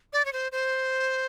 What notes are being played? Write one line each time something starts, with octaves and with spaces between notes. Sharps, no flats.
D5
C#5
C5
C5